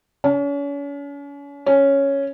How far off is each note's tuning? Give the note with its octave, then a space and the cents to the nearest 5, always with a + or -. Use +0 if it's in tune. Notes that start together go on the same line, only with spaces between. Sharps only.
C#4 +40
C#4 +0